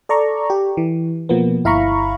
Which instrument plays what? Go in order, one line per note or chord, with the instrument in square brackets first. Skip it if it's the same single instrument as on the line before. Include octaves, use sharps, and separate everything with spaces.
[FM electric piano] A4 D5 A#5 C#6
G4
E3
B2 F3 A#3 B3
G1 E4 F5 A#5 B5 C#6